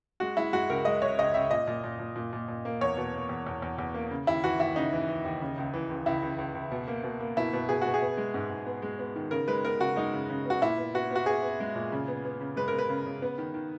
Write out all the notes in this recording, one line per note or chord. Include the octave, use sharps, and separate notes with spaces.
G#3 F#4
G#3 E4
G#3 F#4
C#2 A#4
G#3 D#5
G#3 C#5
C#2 D#5
C#2 E5
A#2 D#5
A#2
A#2
A#2
A#2
A#2
A#2
A#3
E2 C#5
B2
A#3
E2
E2
E2
E2
A#3
C#3
D#2 E4
E3 F#4
D#2 E4
C#3 D#4
E3
E3
D#2
C#3
C#2
E3
C#2
C#2 E4
C#2
C#2
C#2
B2
A#3
B2
A#3
B2 E4
B2
B2 G#4
B2 F#4
G#4
B3
G#3
G#2
G#2
B3
G#3
B3
D#3
C#3 A#4
G#3 B4
B3 A#4
C#3 F#4
G#3 D#4
C#3
C#3
B3 F#4
A#2 E4
B3
B3 F#4
B3 F#4
B3 G#4
B3
G#3
A#2
C#3
B3
B3
C#3
G#3 B4
A#4
B3
B4
C#3
C#3
B3
D#3
D#3